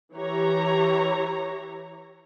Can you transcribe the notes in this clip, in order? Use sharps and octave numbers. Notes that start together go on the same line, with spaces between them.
E3 G4 C#5 A#5